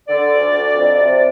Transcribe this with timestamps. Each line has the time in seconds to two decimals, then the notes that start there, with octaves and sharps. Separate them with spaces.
0.08 D3 D5
0.31 D2
0.52 D2
0.74 F2
0.98 C3